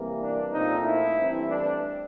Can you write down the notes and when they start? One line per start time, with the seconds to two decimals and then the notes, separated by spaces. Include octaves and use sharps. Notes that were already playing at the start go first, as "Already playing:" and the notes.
Already playing: C3 E3 G3 A#3
0.21 D4
0.52 A#2 F3 A3 C4 D#4
0.84 E4
1.15 G2 E3 A3 C4
1.47 D4